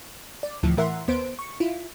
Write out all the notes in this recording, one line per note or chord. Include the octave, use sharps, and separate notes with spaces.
D5
D2 A2 E3 F3
A2 E3 A#4 E5 F#5 C6
D#2 B3 C5 D7
C#6
E4 F4